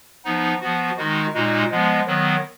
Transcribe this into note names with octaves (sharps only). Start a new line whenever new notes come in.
F3 B3 D#4
F3 B3 F#4
D#3 G#3 D#4 F#4
A#2 G#3 D#4 F#4
F3 G#3 B3
D#3 F#3 B3